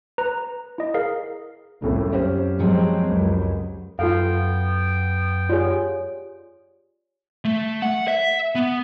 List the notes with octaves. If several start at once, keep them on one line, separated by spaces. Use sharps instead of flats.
B4 A#5
E4 D#5
G#4 A#4 F5
C2 F2 A2 C#3
F#2 C#4 G4 C5
F3 F#3 G#3 C4
C#2 F#2
F#2 B3 F4 A4 F5 G5
F4 G4 G#4 C#5 D5
A3
F#5
E5
B3